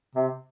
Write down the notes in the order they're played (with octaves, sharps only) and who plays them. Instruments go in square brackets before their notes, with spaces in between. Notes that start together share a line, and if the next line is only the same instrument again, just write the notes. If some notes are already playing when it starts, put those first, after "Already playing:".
[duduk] C3